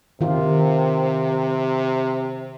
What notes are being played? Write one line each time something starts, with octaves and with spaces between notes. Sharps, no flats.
C3 D#3 F4